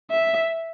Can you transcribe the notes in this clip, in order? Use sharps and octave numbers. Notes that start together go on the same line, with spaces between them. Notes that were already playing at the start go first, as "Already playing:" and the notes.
E5